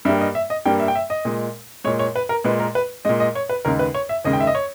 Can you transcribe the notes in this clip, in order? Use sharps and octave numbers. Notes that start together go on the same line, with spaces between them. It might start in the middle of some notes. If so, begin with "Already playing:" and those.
G2 G3 A#3 E5
D#5
E5
D#5
G2 G3 A#3 G5
E5
G5
E5
D#5
A#2 G#3
A#2 G#3 C#5
C#5
B4
A#4
A#2 G#3 B4
A#4
B4
A#2 G#3 D#5
D#5
C#5
B4
D#2 C#3 G#3 A#4
B4
C#5
E5
D#2 C#3 G#3 D#5
G5
E5
D#5
C#5